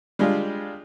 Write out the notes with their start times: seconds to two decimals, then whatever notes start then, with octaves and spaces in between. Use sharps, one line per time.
0.19 G3 G#3 D4 F4